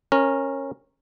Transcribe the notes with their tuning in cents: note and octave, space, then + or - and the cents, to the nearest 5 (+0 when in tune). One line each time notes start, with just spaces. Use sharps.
C#4 -20 A#4 +0